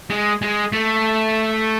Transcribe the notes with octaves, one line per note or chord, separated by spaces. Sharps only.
G#3
G#3
A3